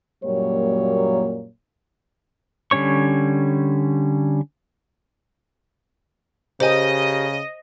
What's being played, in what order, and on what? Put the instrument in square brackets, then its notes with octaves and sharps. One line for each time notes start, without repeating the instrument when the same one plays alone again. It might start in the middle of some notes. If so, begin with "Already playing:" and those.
[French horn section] F#2 A#2 F#3 G3 A#3 C#5
[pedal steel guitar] D3 G3 C#4 C#5 C#6
[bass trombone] C#3 [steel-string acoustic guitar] G4 A#4 [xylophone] C5 G#5 [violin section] D#5